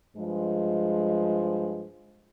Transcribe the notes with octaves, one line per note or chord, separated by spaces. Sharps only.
G2 F3 G#3